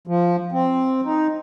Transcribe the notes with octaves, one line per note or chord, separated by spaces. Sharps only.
F3
C4
D#4